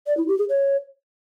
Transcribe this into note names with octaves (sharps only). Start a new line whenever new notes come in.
D5
E4
G4
G#4
C#5